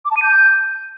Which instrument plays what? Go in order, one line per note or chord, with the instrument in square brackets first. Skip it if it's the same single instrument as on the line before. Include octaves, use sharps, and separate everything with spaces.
[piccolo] D6
A5
D#7
G6